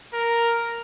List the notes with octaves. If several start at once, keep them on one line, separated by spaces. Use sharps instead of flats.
A#4